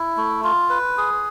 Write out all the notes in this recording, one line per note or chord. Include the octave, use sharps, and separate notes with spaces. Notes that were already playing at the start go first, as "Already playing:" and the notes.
Already playing: E4
A3
F4
B4
G#4